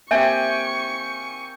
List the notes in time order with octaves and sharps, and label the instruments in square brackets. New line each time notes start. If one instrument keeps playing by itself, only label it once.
[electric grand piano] A#3 C4 G4 [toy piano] E5 [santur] G5 G#5 [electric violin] C#6